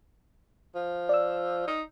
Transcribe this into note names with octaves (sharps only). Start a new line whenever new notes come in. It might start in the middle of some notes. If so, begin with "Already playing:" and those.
F3
D5 E6
D#4